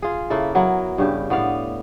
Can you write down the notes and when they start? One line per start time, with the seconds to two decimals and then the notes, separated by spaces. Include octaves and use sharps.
0.02 F4 G#4
0.30 C#3 A#3 E4 A4
0.55 F#3 B3 E4 A#4
0.98 G2 C#3 G4
1.30 A2 B3 D5 F5